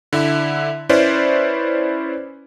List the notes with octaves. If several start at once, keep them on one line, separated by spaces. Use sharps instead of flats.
D3 E4 E5
C#4 E4 B4 C5 D5